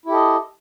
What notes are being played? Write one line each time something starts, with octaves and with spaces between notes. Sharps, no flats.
E4 G4 A4 D#5